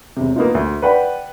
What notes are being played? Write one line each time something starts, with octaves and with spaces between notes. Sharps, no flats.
E1 C3
A#3 B3 D#4 F4
D2
B4 D5 F#5 G5 B5